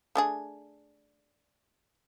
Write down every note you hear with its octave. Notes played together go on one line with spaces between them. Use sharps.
A3 D4 G#4